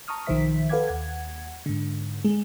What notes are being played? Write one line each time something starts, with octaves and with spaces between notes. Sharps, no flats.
A5 A#5 C#6 D#6 F6
B1 D#3 F3 C5 E5 B6
A4 B4 F5 F#5 D6 G#6
D#2 F#5 G#6
G#2 D3
G#3 G#4